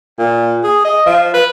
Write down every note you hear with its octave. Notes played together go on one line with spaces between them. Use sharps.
A#2
G#4
D#5
F3
B4